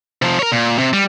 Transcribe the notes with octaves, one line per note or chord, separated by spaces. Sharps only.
C3 F3
A#4 C#5
A#2
C3
G3